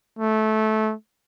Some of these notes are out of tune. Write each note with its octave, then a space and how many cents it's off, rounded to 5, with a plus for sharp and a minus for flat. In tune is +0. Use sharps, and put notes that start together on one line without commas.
A3 -20